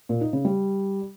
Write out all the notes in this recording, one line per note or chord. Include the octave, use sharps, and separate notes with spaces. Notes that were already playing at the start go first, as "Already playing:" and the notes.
A#2
D#4
C#3
G3